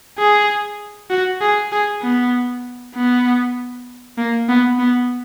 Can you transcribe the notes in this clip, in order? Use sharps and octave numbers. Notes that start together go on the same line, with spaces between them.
G#4
F#4
G#4
G#4
B3
B3
A#3
B3
B3